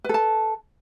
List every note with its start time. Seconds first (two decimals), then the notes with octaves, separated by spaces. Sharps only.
0.04 B4
0.09 A4
0.14 A5